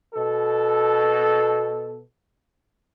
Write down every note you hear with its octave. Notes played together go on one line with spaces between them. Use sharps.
B2 A4